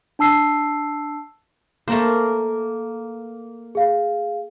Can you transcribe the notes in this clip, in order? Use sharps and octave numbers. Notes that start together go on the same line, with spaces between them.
D4 A5 E6 C7
A3 A#3 A#4 C5
G#4 F5